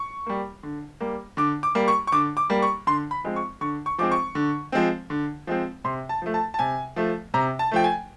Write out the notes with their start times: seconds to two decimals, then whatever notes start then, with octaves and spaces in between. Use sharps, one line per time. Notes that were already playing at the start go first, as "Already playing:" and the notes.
Already playing: C#6
0.26 G3 A#3
0.63 D3
1.01 G3 A#3
1.37 D3 D6
1.63 D6
1.75 G3 A#3
1.88 C#6
2.07 C#6
2.12 D3 D6
2.37 D6
2.50 G3 A#3
2.62 C#6
2.87 D3 C6
3.11 B5
3.24 F3 G#3 C4
3.36 C#6
3.61 D3 C#6
3.86 C#6
3.98 F3 G#3 C4 D6
4.11 C#6
4.35 D3
4.72 F3 G#3 C4
5.10 D3
5.47 F3 G#3 C4
5.84 C3 C6
6.09 A5
6.22 F3 A3
6.34 A5
6.54 A5
6.59 C3 G#5
6.96 F3 A3
7.34 C3 A#5
7.59 A5
7.71 F3 A3 G5
7.84 G#5